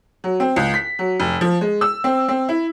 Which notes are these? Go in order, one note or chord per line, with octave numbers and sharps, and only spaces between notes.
F#3
C4
C#2
B6
F#3
F1
F3
G#3
E6
C4
C4
E4